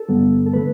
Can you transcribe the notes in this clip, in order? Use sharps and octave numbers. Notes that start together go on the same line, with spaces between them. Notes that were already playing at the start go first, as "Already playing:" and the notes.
Already playing: A4
G2 D3 G3 B3
A4
D3 A3 B4